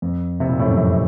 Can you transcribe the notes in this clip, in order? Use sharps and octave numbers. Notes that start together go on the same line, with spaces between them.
F2
C3
A#2
A2
F#2
F2